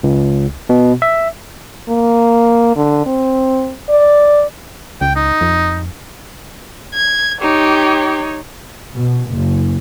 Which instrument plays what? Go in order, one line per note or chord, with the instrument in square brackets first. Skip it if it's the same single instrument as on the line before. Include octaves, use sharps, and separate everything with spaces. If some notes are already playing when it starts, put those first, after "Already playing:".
[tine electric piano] C#2
B2
E5
[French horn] A#3
D3
C4
D5
[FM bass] C#2 [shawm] G5
[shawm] D#4
[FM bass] F2
[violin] G#6
[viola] D#4 C#5 [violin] G4
[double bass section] B2
F#1